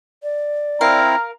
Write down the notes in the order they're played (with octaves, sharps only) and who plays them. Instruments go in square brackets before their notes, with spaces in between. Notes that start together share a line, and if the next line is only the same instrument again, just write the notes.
[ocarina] D5
[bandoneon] C4 E4 [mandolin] A#4 F5 [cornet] A#5